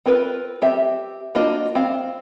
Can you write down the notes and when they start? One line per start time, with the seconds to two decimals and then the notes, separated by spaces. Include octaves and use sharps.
0.06 C4 F4 A#4 B4
0.62 C4 G4 E5
1.35 A#3 D4 F4 F#4 D#5
1.75 C4 F5